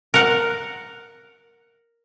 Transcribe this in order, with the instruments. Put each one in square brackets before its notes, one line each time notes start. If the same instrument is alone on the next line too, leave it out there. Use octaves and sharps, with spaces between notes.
[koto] A#4 F#5